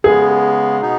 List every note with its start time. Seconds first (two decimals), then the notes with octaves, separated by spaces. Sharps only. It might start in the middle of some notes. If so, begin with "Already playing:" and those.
0.04 C#3 G#3 B3 G#4
0.81 B2 B3 D#4